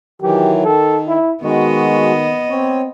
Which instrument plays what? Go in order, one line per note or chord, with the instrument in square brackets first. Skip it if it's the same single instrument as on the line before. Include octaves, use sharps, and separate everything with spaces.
[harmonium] D#3 E3 F#3 [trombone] G4
[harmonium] D#3 [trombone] A4
[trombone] E4
[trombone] D#3 [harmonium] G#3 F#4 [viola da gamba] B3 D#5
[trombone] C4 [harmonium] C#5